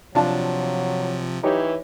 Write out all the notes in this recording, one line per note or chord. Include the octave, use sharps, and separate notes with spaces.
C3 F3 F#3 D4 F4 A5
E3 D#4 G4 C#5